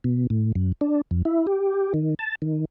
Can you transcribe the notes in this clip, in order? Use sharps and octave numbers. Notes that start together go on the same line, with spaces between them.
B2
A2
F#2
D4
F2
E4
G4
D#3
A5
D#3